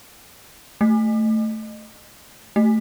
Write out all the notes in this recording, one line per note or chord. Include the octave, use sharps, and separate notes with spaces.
A3
A3